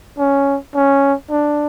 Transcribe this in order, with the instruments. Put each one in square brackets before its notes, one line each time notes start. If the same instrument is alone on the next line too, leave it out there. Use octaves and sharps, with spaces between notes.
[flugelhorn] C#4
C#4
D4